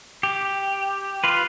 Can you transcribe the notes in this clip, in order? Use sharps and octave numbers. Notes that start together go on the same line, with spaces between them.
G4
F4 B4